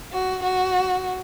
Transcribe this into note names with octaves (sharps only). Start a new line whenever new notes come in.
F#4
F#4